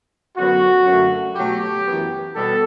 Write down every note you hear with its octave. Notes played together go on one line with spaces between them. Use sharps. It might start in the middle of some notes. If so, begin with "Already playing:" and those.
F#2 D3 F#3 B3 F#4
F#2 D3 F#3 A3
B2 F#3 A3 G4
F#2 E3 B3
B2 G3 B3 A4